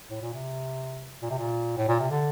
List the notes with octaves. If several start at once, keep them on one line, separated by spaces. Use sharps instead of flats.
A2
A#2
C3
A#2
C3
A#2
A2
A#2
C3
D3